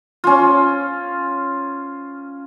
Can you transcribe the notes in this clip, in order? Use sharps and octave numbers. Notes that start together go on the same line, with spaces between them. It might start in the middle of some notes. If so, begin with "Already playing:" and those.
C#4 F4